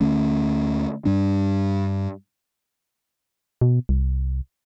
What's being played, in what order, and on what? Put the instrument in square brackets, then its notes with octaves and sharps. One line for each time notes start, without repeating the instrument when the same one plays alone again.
[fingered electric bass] D2 D3 A3 C#4
G2 G3 D4
[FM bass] B2
C2